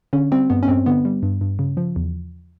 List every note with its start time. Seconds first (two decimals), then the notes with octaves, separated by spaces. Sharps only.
0.13 D3 C#4
0.32 G3 C4
0.50 G2 B3
0.63 C#4
0.68 G2 C4
0.86 D3 B3
1.05 G3
1.23 G2
1.41 G2
1.59 C#3
1.77 F3
1.96 E2